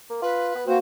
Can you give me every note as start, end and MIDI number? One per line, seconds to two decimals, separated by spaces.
0.10 0.20 58
0.22 0.55 65
0.22 0.71 71
0.55 0.64 59
0.67 0.79 58
0.67 0.77 60
0.67 0.79 66
0.67 0.79 72